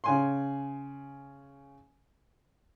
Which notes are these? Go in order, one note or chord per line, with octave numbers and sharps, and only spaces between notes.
C#3 G#5 C6